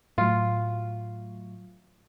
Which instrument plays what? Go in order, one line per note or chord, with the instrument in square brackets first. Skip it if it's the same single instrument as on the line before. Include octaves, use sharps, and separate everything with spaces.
[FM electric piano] A2 F#3 [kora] F4